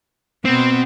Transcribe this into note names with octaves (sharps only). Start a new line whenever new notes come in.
B2 B3 C4